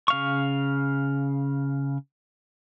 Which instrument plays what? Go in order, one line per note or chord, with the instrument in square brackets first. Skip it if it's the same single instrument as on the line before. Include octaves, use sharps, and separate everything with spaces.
[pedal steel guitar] C#3 F5 C#6